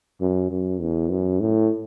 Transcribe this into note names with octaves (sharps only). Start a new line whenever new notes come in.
F#2
F#2
E2
F#2
A2